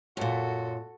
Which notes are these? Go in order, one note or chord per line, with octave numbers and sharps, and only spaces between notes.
F#2 A#2 F#4 A4